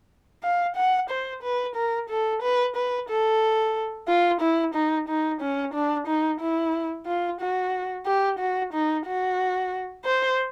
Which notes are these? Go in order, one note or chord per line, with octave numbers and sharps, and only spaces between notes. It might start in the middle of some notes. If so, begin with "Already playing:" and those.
F5
F#5
C5
B4
A#4
A4
B4
B4
A4
F4
E4
D#4
D#4
C#4
D4
D#4
E4
F4
F#4
G4
F#4
D#4
F#4
C5